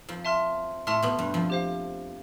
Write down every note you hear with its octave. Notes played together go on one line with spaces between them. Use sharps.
F2 F3
E5 A5 C6 F6
A2 A3 E5 A5 C6 F6
B2 B3
G2 G3
F2 F3
G4 C5 F5